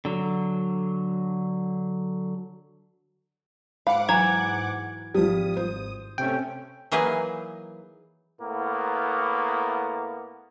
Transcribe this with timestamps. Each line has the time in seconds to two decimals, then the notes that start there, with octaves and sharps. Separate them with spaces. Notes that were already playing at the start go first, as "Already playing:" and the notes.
0.05 D3 F#3
3.87 G#2 F5 F#5 B5 D6
4.09 E3 F#3 A#5 G#6
5.14 G#1 F3 G3 D#6
5.57 C5
6.18 C3 A3 C#4 G5
6.92 E3 F#3 A#3 D#4 G#4 B4
8.40 A2 A#3 B3